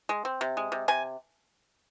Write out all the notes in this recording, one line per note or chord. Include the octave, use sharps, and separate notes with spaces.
G#3
C4
C3
G#3
C3
C3 G#5